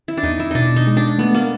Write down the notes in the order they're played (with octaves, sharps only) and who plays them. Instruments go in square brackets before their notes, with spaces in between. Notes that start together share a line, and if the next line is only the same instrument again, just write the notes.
[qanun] E4
D4
[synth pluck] E2 [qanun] D#4
[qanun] E4
[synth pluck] B2 [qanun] D4 D#4
[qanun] D#4
[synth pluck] G#3
[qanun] D4
[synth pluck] A3 [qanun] B3
[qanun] A#3